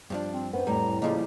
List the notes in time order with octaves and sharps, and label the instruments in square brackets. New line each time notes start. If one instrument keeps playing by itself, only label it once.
[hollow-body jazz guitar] G2 F3 D4
[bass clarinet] C4
[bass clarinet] F#2 [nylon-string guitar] B3 [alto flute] C5
[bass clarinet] F2 [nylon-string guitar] A2 [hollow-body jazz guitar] G3 [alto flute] A#5
[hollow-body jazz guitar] C#3 F3 G3 [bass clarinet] A#3 [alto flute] D#5